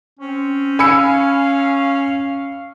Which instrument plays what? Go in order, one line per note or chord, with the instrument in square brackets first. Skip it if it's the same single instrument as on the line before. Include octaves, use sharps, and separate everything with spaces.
[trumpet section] C4 C5 [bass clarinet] C#4
[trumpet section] F5 [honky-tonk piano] G#5 C#7 [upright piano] B5 E6